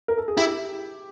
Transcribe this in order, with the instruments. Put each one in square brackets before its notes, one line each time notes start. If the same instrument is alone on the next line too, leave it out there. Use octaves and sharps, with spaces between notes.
[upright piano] A#4
A4
G#4
[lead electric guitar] E4 [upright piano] G4